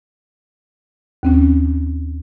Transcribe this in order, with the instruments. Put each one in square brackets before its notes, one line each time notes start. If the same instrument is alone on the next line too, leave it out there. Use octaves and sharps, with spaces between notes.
[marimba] D#2 C4 C#4